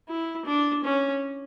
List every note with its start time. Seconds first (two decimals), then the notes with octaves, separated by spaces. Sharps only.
0.09 E4
0.45 D4
0.84 C#4